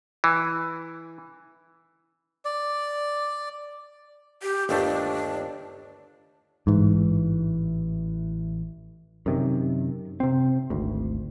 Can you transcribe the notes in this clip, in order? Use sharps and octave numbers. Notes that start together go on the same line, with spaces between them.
E3
D5
G4
G1 D#2 A3 D4
A1 G#2 E3
F#2 C3 D#3
C3 C4
G#1 D2